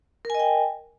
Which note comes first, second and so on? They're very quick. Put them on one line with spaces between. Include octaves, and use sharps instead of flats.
A#4 G#5 D#5 G5